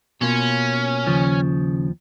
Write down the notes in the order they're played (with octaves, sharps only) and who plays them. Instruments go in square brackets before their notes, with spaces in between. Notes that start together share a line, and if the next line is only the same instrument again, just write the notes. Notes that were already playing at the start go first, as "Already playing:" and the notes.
[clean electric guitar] B2 A#3 F4 [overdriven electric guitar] C#4
[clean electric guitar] D#2 C#3 F3